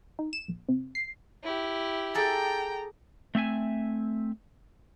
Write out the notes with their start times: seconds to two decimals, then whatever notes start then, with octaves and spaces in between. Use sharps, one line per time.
0.19 D#4
0.33 E7
0.48 A#1
0.68 C3
0.95 C7
1.43 E4 G4
2.14 G#4 A4 D5 G5 A#5
3.35 A3 C4 E5 G#5